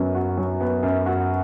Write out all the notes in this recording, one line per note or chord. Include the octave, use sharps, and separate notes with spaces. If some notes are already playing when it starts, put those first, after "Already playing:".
Already playing: F#2 F#3 B3
F#4
F#3
B3
F#2
F#4